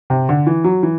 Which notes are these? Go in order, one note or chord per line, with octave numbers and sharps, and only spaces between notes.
C3
D3
E3
F#3
E3